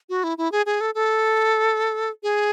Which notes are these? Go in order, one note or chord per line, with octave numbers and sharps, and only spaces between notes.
F#4
E4
E4
G#4
G#4
A4
A4
G#4